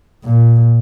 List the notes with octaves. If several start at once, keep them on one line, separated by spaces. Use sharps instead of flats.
A#2